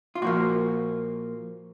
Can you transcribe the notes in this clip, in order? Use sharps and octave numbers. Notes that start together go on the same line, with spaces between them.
F4
A#2 F3 A#3 F#4